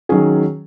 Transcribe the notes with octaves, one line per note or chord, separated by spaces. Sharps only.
D#3 F#3 C#4 G#4